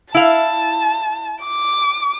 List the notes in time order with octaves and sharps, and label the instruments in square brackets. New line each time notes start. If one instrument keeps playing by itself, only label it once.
[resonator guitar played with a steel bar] E4 F5 [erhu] A5
[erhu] D6